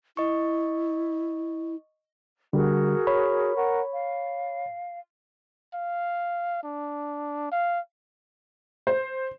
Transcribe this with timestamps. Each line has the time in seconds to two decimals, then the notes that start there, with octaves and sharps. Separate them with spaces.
0.17 E4 D#5 C#6
2.53 D3 G3 F#4 G#4 A#4
3.07 C#5 B5
3.56 A#4 F#5 C#6
3.92 F5
5.74 F5
6.64 D4
7.52 F5
8.87 C5